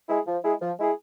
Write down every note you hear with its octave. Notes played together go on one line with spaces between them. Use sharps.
G#3 E4 G#4
F3
G#3 E4 G#4
F3
G#3 E4 G#4